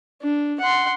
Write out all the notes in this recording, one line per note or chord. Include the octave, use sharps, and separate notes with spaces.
D4
F#5 C6